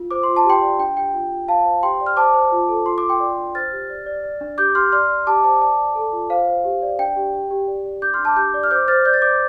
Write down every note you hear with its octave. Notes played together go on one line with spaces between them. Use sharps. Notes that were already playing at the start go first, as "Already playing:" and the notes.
Already playing: F4
C5 D6
F4 C6
A5
G4 G5 C6
D5
D4 G5
G4 G5
F4
F4
C5 F5 A5
C5
G4 G5 C6
D5
F6
C5 A5 D6
C5
F4
A4
F4 C6
D6
F4
G5 C6
D5
D4
C5 F6 A6
G4
D5
D5
D5
D4
G4 D6 G6
G4 C6 F6
D5 C6 F6
D5
G4 A5 D6
C5 A5 D6
D5 A5 D6
D5
A4
F4
C5 F5
C5
G4
D5
D4 G5
G4
G4
G4
D5
D5
D4 D6 G6
C6 F6
D4
A5 D6
G4 D6 G6
D5
F6
C5 D6 G6
C5 F6 A6
D5 G6
A6
D5 D6 G6